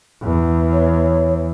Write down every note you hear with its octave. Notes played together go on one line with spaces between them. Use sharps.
E2
C#5